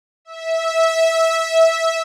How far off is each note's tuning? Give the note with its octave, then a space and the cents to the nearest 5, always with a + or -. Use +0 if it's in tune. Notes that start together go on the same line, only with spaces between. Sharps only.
E5 -15